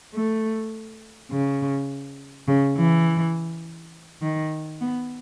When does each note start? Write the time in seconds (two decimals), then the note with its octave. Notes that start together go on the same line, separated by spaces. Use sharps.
0.14 A3
1.31 C#3
2.48 C#3
2.77 E3
4.22 D#3
4.81 B3